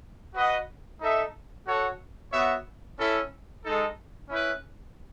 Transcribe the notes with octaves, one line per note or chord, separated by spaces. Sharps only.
F#4 B4 D#5 F#5
D#4 A4 E5
F#4 A4 C#5 F#5
B3 F#4 C#5 E5
C#4 E4 A4 E5
G#3 D#4 A4
C#4 E4 B4